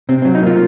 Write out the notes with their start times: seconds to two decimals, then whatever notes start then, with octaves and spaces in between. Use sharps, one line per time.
0.09 C3 C4
0.22 C4
0.25 F#3
0.35 D#4
0.43 A#3 F4